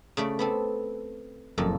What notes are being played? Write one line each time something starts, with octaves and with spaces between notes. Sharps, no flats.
C#3 A3 D5
B3 C4 A4
F#1 F2 A#2 A4